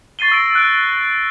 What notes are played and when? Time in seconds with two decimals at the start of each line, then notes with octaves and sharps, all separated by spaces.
0.19 C#6 A6 C7 D#7 G7
0.31 E6 A#6 D7
0.55 F#6 D7